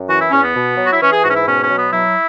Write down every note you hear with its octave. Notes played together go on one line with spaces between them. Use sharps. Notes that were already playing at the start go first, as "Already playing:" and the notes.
Already playing: F#2
E3 F#4
E4
E2 C#4
B3
B2
F#3
F#4
E4
E3 C#4
G#4
G#2 F#4
C#4
E4
B2 C#4
C#4
F#3
B3
F#3 E4